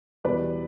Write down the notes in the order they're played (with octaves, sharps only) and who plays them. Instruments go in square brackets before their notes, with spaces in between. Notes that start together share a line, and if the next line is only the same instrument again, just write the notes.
[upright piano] E2 B2 G3 B4 D5